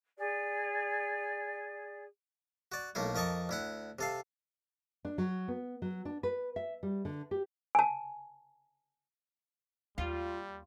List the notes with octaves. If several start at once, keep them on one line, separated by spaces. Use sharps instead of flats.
G#4 D5
F#4 D5
B1 A3 A#3 E4
F2 A#4 D#5 A5 C#6 D6
D2 E4 F#5
C3 A4 F5
D4
F#3
B3
F#3
D4
B4
E5
G3
D3
G4
G#5 A5
D#2 G3 F4